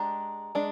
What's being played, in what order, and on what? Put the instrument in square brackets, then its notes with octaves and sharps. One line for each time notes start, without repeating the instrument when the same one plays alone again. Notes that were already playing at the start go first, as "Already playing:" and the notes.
Already playing: [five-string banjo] G#3 D4 G4 [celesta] A#5
[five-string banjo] G#3 D4